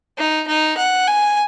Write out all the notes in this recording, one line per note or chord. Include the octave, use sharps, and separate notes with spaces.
D#4
D#4
F#5
G#5